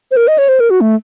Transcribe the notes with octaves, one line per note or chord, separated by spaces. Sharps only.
C5
A#4
D#5
C#5
C5
A#4
F#4
A3